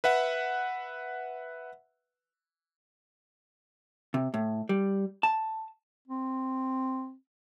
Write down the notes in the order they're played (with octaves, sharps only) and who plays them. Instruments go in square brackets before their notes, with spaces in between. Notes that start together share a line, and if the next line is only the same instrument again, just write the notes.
[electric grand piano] B4 E5 F#5
[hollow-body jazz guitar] C3
A2
G3
A5
[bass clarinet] C4